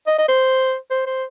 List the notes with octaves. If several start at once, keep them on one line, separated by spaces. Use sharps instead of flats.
D#5
D#5
C5
C5
C5